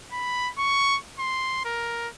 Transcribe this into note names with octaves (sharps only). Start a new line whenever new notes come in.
B5
C#6
C6
A#4